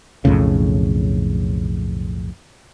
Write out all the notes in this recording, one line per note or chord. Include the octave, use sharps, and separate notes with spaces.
B1 F2 A2 C#3